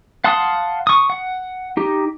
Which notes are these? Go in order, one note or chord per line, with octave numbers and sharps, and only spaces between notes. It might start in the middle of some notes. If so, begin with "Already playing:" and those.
F5 F#5 A5 C6 D#6
C#6 D#6
F#5
D#4 G4